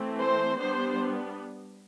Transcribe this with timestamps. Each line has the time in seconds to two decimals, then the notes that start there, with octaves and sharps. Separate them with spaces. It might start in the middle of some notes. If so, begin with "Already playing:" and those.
Already playing: E3 A3 C4
0.19 C5
0.59 G3 B3 D4 C5